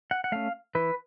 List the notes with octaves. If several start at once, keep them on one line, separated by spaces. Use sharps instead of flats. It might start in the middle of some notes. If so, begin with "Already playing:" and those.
F#5
F#5
A3 C#4 F5
E3 B4